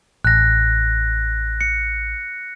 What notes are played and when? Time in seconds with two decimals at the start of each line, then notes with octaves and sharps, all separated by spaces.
0.25 A1 F#6 A#6
1.61 C#7